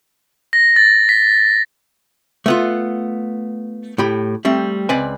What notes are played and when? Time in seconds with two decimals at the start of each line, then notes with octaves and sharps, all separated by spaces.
0.53 A#6
0.76 A6
1.09 B6
2.46 A3 B3 F4
3.98 A2 G4 B5
4.45 G3 A3 C4
4.89 C#2 C4 B4 D5 G#5